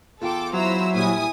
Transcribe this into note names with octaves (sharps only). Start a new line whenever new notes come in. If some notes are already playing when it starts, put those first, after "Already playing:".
E2 F4 A4 G5 D6
F#3 E4 C5 A#5 E6
A#2 G3 G#5 D#6